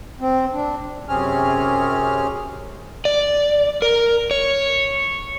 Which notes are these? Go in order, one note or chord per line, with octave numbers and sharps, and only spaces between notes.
C4
D4
F#2 C3 C4 C#4 G#4 F6
D5
A#4
C#5